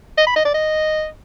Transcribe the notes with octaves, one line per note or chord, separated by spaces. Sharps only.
D#5
B5
D#5
D5
D#5